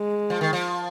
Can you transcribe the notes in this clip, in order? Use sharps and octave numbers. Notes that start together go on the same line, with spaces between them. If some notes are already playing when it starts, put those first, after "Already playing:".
Already playing: G#3
F3
D#3
F3